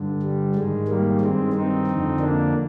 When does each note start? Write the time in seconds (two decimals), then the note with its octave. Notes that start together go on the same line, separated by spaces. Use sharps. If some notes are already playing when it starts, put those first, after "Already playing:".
Already playing: G2 D3
0.23 G3
0.55 G#2 D#3 G#3
0.88 G3 A#3
1.21 G2 D#3 G#3 C4
1.54 C4 D#4
1.87 F2 D3
2.20 A#3 D4